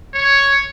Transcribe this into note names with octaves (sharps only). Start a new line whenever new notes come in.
C#5